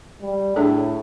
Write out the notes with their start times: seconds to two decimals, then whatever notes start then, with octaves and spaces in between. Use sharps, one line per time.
0.21 G3
0.56 A2 D4 G#4 A4